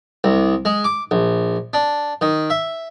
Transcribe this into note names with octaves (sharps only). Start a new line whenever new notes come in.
C2
G#3
D6
A#1
D4
D#3
E5